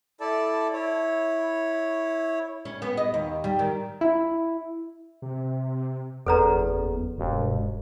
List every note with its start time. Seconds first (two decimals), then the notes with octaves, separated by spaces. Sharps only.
0.20 E4 A4 D5 A5
0.73 E4 C#5
2.65 C#4
2.82 B3
2.97 D#5
3.14 D#2
3.44 G3
3.59 D#3
4.01 E4
5.22 C3
6.27 F#1 E2 A4 B4 A#5
7.18 E1 G2